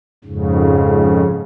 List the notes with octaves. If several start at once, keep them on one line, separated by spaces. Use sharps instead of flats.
F2 G#2 C#3